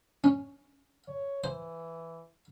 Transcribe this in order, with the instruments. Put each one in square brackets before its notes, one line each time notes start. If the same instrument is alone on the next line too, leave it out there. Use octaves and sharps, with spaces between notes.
[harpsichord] C#4
[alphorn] C#5
[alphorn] E3 [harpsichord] C5